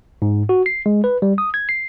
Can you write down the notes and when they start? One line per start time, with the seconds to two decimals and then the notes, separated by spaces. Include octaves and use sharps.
0.22 G#2
0.49 F#4
0.66 C7
0.86 G#3
1.04 B4
1.22 G3
1.38 D#6
1.54 G#6
1.69 C7